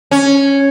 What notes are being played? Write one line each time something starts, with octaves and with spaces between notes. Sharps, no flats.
C#4